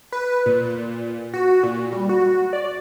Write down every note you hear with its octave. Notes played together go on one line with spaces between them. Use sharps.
B4
A#2
F#4
A#2
G3
F#4
D5